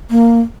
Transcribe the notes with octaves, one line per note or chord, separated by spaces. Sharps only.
A#3